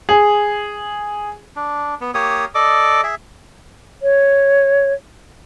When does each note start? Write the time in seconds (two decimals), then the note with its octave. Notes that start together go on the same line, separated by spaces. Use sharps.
0.09 G#4
1.56 D4
2.01 B3
2.14 A#3 G4 C#5 D#6
2.55 A4 D5 D#5 D6
3.03 G#4 E5
4.02 C#5